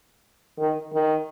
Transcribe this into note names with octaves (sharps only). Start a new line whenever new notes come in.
D#3
D#3